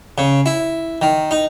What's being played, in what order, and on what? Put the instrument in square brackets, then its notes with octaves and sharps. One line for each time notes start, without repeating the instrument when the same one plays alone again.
[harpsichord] C#3
E4
D#3
D#4